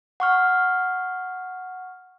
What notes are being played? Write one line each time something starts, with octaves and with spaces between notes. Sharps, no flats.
F#5 C#6 F6